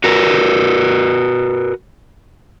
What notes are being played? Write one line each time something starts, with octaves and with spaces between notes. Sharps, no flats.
F#4 A#4 B4